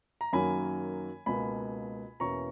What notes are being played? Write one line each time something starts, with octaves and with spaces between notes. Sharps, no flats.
A#5
F#2 D#3 F#3 A#3 C#4 G#5 B5
C#2 B2 A#3 G#5 B5
E2 B2 A#3 C#4 E4 A#5 C#6